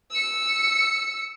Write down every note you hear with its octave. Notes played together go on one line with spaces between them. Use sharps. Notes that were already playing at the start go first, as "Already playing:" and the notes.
E6 C#7